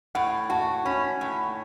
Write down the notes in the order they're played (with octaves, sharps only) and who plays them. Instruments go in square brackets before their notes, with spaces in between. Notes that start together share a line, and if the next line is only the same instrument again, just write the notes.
[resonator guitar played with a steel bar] A2 [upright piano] F#5
[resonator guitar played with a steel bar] F#4 [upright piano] A5
[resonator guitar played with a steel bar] C#4 [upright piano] B5
[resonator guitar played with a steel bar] A2